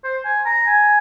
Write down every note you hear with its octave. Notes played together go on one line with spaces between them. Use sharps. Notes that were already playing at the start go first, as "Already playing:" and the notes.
C5
G#5
A#5
G#5